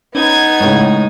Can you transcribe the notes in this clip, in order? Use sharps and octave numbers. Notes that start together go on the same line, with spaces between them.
B3 C#4 D#4 G#6
A2 C#3 G#3